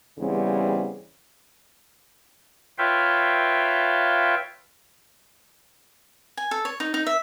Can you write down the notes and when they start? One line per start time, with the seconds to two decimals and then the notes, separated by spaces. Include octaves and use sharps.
0.19 E2 C#3 G3 C4
2.78 F4 B4 C#5 E5 F5 G5
6.37 G#5
6.51 A4
6.65 C#5
6.80 D#4
6.94 D#4
7.06 E5